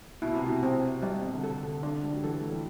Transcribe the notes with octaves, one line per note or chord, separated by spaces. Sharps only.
B2 E4
C3
B2
C3 C4
C3 G3
B2
D3
C3 A4
D3
D3 D4
G3
F#3
E3 A4
A3
G3